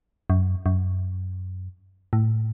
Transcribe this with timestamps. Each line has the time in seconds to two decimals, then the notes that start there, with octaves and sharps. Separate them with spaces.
0.30 F#2
0.66 F#2
2.13 A2